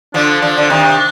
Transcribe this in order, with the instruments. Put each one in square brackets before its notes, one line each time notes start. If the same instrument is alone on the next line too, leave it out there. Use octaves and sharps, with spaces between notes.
[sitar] D3 F3 [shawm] D4
[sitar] D3 F3
D3
C3 D#3